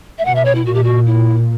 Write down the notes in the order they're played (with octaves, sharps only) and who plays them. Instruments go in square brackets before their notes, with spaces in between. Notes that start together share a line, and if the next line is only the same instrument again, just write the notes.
[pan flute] E5
[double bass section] B2 [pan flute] F#5
[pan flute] E5
C#5
E4
[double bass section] A#2 [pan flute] F#4
[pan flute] G4
F#4
E4